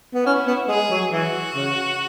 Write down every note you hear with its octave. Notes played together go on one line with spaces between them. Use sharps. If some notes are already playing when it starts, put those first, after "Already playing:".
B3
C#4 E4
B3
G#3 G#4
F#3
E3 F#4
C#3